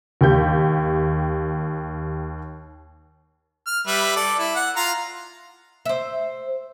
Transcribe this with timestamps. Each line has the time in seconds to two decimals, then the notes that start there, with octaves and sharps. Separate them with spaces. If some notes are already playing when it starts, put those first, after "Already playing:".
0.21 D#2 G4 G6
3.67 F6
3.87 G3 B4 E5
4.16 A4 D5
4.39 E4
4.56 F#5
4.76 F4 F5 A#5
5.86 C5 E5